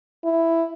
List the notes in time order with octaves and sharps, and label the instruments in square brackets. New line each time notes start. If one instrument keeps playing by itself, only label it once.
[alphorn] E4